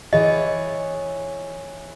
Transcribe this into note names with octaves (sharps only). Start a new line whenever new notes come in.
E3 G#4 C#5 D#5